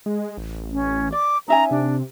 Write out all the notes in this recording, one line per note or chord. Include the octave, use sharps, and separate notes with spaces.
G#3
A1
C#4
D5 D6
C#4 D#4 E5 G#5 A#5
C3 D4